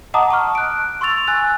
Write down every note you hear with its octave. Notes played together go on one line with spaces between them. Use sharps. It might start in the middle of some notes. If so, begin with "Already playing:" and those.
D#5 F#5 A5 A#5 D6 D#6
A5 C#6 F6
F#6 D7
C6 C#6 E6 A6 F7
G#5 E6 F#6 A6